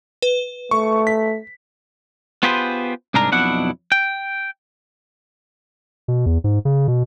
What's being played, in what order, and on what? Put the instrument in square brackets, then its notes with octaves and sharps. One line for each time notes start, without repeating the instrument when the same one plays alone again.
[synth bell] B4
[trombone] A3 [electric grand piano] C#6
[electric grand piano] B6
[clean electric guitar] B3 F4 G4 G#4 B4 C5
C2 G#2 D4 G#4 A#4 A#5
B1 F2 B2 D4 E4 F#5
G5
[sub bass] B2
E2
G#2
C#3
B2